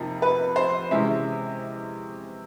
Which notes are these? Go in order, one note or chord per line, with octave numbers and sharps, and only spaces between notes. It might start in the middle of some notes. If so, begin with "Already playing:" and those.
Already playing: F2 C3 F3 A#3 D#4
B4
C5
C3 E3 G#3 C#4 E5